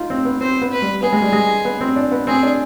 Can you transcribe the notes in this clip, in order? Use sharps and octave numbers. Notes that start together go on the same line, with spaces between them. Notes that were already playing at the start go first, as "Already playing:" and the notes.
Already playing: D#4 F4
C4
B3
C4 C5
B3
B4
G3
B3 G#4
G#3
G3
G#3
B3
C4
D4
B3
C4 G#4
D4